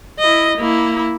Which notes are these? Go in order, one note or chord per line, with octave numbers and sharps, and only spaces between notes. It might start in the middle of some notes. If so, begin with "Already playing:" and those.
E4 D#5
A#3 E4